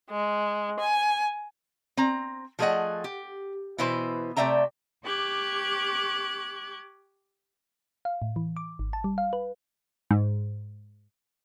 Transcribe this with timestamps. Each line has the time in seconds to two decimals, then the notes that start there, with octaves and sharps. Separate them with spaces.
0.10 G#3
0.80 G#5
1.97 C4 A#5
2.59 F3 A3 G#4 A4 D#5 F#5
3.04 G4
3.78 B2 E3 E4 B4 C5
4.36 C3 A3 D5 E5 G5 A#5
5.04 G4 C#6 D6 F#6 G#6
8.05 F5
8.22 A2
8.36 E3
8.57 D6
8.79 G#1
8.93 A5
9.04 G3
9.18 F5
9.33 B4
10.11 G#2